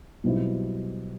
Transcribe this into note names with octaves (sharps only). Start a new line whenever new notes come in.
B1 B2 G3 C4 E4